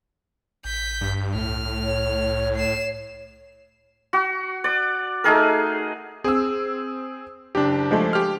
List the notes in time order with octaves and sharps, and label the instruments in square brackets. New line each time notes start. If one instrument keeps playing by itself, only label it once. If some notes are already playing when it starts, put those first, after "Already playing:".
[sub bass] A1 [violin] G6 B6
[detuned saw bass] G2
[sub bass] C2 [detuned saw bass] A2 [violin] F6
[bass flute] C#5
[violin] C7 E7
[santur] F#4
D5
A3 D#4 G#4 A#4
[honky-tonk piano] C4 E6 [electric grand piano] G#4
[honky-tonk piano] F#1 [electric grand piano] D4 G4
[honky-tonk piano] F3 G#3 A3
[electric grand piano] G4 F6